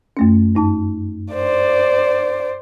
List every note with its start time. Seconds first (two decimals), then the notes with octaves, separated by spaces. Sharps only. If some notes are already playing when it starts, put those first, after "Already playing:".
0.17 F#2 A3 C#4
0.55 G2 D#4 A5
1.33 C5 D5